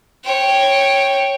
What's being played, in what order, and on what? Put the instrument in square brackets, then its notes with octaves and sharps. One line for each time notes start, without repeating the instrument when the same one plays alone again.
[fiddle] C#5 G5